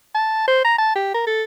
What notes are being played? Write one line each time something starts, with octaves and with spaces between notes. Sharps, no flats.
A5
C5
A#5
A5
G4
A#4
A4